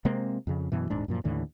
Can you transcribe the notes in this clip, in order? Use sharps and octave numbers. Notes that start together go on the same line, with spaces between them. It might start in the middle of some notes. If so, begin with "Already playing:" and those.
C3 G#3 A#3 C4
F2 C#3
F#2 B2 E3
D#1 G#2 D4
F#2 A#2 F3
D#2 A2 D3 E3